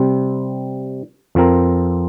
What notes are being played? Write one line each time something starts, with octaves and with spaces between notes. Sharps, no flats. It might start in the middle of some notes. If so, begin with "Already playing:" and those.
Already playing: C3 G3 C4
F2 F3 C4 A#4